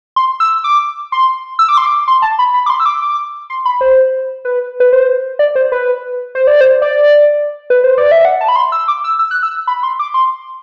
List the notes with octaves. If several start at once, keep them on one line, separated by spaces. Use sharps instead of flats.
C6
E6
D6
C6
E6
D6
C6
D6
C6
A5
B5
B5
D6
C6
E6
D6
D6
C6
B5
C5
B4
B4
C5
D5
C5
B4
C5
D5
C5
D5
B4
C5
D5
E5
F#5
A5
B5
C6
E6
D6
E6
E6
F#6
E6
B5
C6
D6
C6